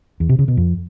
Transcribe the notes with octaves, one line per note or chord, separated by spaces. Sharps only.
E2
C3
C#3
B2
F2